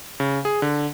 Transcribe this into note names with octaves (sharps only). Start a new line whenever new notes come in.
C#3
G#4
D3